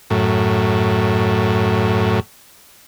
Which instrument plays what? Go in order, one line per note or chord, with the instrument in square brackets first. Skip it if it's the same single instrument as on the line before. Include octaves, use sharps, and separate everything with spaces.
[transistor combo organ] F#2 A2